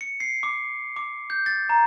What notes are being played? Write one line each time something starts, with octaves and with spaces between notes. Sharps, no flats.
C#7
C7
D6
D6
G6
A6
A#5